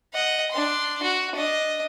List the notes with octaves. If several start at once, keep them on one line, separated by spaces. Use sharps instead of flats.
D#5 F#5
D4 C6
F#4
D4 D#5